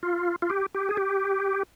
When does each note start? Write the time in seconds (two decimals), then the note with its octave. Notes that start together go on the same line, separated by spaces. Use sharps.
0.03 F4
0.42 F4
0.50 G4
0.75 G4
0.89 G#4
0.97 G4